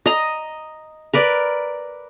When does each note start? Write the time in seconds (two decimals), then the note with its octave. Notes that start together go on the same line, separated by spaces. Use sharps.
0.06 D#5 A#5
1.13 A#4 B4 D5